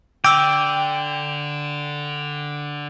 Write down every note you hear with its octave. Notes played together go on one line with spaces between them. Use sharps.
D3 G5 D6 E6